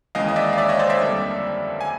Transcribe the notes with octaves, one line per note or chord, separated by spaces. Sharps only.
D#2 C#3 E3 G#3 D#5 F5
D#5
D5 E5
F5
D5 E5
C#5 D#5
C5 D5
D5 E5
F2 D3 G3 A#3
G#5